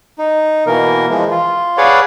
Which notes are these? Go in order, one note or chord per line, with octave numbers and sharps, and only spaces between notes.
D#4
B2 E3 A#3 A#4
E3 F3 G#3
F4
G#4 B4 C#5 D5 F5 F#5